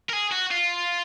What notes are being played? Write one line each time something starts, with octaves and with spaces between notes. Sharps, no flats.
A#4
G#4
F#4
F4